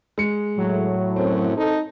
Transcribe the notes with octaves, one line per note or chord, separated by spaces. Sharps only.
G#3 C#7
A2 F#3
F#2 C4
D#4 A4